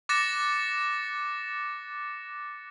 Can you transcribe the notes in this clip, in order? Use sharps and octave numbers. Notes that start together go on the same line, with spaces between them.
D6 F#6 A6 A#6 C#7 E7